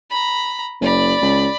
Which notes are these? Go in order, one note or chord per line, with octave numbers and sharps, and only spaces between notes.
A#5 B5
F#1 D5 B5
C#2